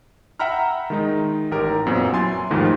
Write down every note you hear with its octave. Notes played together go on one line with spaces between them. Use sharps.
E5 F#5 G5 A#5 B5 F6
D#3 G#3 D#4
A1 D#4 G4 A#4
F#2 A#2 B3 C4
F#3 E4 G#5 C6 A6
D#2 G#2 D#3 F3 A3